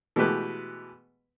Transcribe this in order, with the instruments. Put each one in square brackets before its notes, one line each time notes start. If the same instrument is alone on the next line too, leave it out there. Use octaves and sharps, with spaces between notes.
[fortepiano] B2 E3 G#3 A3 G4 B4